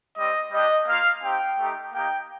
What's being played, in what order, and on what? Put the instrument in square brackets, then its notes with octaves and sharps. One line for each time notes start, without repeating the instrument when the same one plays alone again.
[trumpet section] G3 C4 G4 D#5
G3 D4 G4 D#5
A#3 F4 F5
C4 D#4 G4 G5
A3 D#4 G4
A#3 D#4 G4 G5